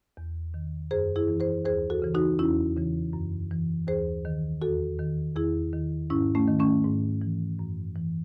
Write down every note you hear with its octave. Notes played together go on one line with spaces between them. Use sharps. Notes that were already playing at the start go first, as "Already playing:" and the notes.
E2
D#3
F#2 G#4 C5
E4 G#4
E3
G#4 C5
D#2 G#4 C5
F#4 A4
C#3 E3
D#4 F#4
E2 C#4 E4
C#3 E3
F#2
E3
D#2 G#4 C5
D#3
E2 F#4 A4
D#3
E2 E4 G#4
D#3
G#2 C#4 E4
A3 C#4
D#3
A3 C#4
G#2
E3
F#2
E3